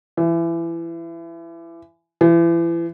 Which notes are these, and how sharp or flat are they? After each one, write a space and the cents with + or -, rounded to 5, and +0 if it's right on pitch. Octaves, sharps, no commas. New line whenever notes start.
E3 +25
E3 +35